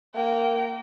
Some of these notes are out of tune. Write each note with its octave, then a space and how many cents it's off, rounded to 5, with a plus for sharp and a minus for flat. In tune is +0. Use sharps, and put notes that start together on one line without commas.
A#3 -10 G5 -25